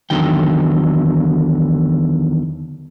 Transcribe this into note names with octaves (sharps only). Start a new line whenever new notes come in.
E2 D3 D#3 F#3 G5